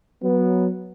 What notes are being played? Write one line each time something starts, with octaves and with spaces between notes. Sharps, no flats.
F#3 B3